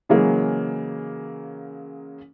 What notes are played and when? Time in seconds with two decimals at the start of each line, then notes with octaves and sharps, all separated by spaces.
0.09 C#3 E3 F#3 G#3 A#3